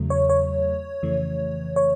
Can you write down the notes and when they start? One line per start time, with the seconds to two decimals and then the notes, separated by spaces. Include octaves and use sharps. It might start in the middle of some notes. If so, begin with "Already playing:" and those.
Already playing: E2 C#3 F#3 A3
0.10 C#5
0.29 C#5
1.03 F2 C#3 E3 A3
1.76 C#5